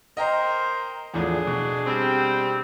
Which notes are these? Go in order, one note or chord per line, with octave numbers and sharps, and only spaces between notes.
A#4 C5 D#5 G5 A#5
E2 A2 F3 D4 G#4
B2
G3 C4